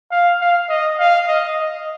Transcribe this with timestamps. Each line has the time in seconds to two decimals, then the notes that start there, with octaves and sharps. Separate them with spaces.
0.11 F5
0.41 F5
0.69 D#5
0.99 F5
1.28 D#5
1.57 D#5